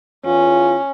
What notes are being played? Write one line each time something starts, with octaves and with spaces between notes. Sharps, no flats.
E2 C#4 F4